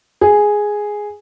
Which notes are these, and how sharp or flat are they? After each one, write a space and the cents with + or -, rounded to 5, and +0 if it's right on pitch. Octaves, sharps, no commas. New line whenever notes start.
G#4 +0